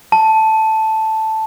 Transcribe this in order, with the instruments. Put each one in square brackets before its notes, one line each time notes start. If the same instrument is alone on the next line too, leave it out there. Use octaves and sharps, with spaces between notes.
[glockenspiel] A5